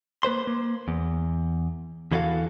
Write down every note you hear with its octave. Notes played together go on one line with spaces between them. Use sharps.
A#3 B4 C5 C6
A#3
E2
E2 E3 E4 F#4 A4 F5